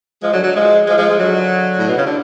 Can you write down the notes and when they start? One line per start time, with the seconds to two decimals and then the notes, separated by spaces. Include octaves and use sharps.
0.22 F3 G#3
0.33 D3 F#3
0.44 D3 F#3
0.55 F3 G#3
0.87 F3 G#3
0.97 F3 G#3
1.09 F3 G#3
1.19 D3 F#3
1.78 A2
1.87 B2
1.98 C#3
2.07 D3